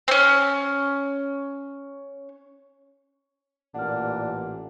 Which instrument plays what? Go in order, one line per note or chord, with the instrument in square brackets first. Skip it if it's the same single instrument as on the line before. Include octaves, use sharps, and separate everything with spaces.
[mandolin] C4 C#4
[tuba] A1 [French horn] A#2 [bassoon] D4 [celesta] F#5 F6